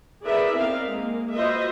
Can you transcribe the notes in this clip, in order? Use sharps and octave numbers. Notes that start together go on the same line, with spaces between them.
E4 G#4 A#4 B4 D5 E5
B3 C4 D#4 A#4 F5
G#3 A#3
F4 F#4 B4 C5 D#5 E5